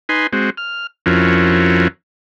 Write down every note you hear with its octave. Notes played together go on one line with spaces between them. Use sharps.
D#4 B4 G#5 C6
G#3 C4 F#4
F6
F2 F3 C#4 E4 F#4 A#4